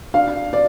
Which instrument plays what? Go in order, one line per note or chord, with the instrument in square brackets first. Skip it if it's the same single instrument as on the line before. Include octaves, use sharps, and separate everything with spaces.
[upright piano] D4 F5
D5